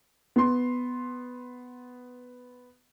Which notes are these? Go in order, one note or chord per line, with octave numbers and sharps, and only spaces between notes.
B3 C6